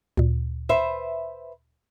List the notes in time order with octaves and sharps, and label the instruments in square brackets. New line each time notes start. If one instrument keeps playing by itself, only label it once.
[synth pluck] D2 A#2
[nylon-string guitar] B4 C5 E5